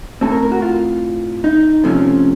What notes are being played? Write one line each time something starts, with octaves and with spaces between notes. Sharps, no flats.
A2 A3 C4 A4
A#4
A#4
F#4
F4
D#4
C3 F3 A3 C#4